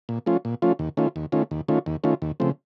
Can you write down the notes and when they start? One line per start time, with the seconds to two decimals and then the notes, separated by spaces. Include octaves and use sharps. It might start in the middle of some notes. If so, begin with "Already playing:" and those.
0.09 A#2
0.26 F3 A3 C#4 F4
0.45 A#2
0.62 F3 A3 C#4 F4
0.79 D#2
0.97 D#3 A3 C#4 F4
1.16 D#2
1.32 D#3 A3 C#4 F4
1.51 D#2
1.68 D#3 A3 C#4 F4
1.86 D#2
2.04 D#3 A3 C#4 F4
2.22 D#2
2.40 C#3 F3 A3 C4